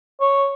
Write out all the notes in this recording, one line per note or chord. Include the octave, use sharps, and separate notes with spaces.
C#5